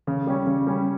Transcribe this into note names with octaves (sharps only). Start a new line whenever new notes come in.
C#3
G3 C#4
C#3
G3 C#4